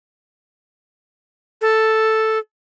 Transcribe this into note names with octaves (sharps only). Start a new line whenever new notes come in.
A4